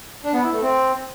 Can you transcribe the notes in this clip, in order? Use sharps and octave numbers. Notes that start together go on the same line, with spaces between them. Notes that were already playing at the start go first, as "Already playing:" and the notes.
D4
B3
E4
A3
C4